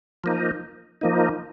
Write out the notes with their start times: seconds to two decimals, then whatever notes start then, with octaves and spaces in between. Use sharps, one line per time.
0.24 F3 A#3 D#4
1.01 F3 A#3 D#4